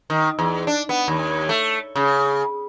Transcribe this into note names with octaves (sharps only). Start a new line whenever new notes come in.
D#3
E2
D4
B3
D#2
A3
C#3